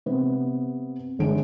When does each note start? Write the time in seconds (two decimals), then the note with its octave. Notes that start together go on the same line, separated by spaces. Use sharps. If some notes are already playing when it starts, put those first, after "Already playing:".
0.06 C3 B3
1.19 G1 D3 G#3 D7